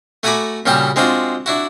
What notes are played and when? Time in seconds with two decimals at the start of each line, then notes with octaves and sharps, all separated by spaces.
0.23 A3 F#4 G#5 A#5 B5 D6
0.66 A#2 C#3 G3 F#4 G4
0.96 G#3 C4 D4 F4 F#4
1.46 D4 E4 F#4